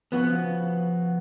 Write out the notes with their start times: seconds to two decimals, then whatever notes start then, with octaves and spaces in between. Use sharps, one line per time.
0.12 C#3 F3 B3 F#4 F#6